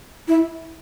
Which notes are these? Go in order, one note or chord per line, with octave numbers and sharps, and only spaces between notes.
E4